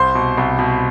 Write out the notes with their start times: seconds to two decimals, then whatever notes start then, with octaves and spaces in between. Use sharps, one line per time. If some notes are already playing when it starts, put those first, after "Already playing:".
Already playing: C2 C5 C6
0.15 B2
0.37 C2
0.59 B2